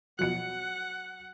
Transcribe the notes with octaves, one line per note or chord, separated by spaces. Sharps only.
B2 F3 F#3 F#5 F#6 C#7